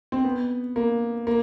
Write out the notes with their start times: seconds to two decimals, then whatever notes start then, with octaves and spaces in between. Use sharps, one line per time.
0.12 C4
0.24 B3
0.76 A#3
1.27 A#3